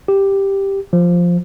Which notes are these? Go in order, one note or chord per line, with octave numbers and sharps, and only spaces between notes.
G4
F3